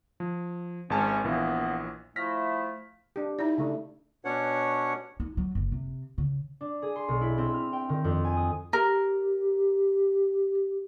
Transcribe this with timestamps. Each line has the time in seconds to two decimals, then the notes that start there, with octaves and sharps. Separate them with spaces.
0.20 F3
0.90 G#1 C3 D#3 G#3 C#4 A5
1.24 A#1 D#2 E3 A#3 B3
2.16 F3 A3 E4 F6 A#6 B6
3.16 D4 G4
3.39 D#4 E4 D5
3.58 C#3 A3 D4
4.25 B2 C#4 D4 C#5 F#5
5.20 D#4
5.37 F#3
5.55 F#1
5.72 C3
6.18 C#3
6.61 D4
6.82 G#4
6.96 C6
7.08 B1
7.21 E4
7.38 C4
7.54 F6
7.73 G5
7.89 D#3
8.04 F2
8.25 G#5
8.37 D#6
8.73 G4 A#4